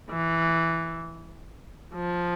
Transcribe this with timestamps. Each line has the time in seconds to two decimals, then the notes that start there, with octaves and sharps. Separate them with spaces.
0.10 E3
1.94 F3